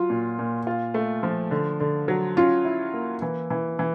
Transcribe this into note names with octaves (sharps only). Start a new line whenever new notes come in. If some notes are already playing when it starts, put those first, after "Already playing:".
Already playing: F#3 F4
A#2
A#2
F4
A3
F3
D3
D3
F#3
C#4 F4
E4
A#3
E3
E3
E3